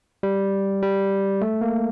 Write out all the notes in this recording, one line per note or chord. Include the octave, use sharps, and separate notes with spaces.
G3
G3
A3
A#3